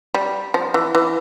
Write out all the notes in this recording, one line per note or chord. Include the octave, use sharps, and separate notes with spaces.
G3
F3
E3
E3